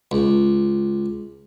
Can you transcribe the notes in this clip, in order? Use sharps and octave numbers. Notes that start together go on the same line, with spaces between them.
C#2